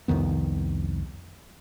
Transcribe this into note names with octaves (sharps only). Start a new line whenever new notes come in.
C2 F2 D#3 B3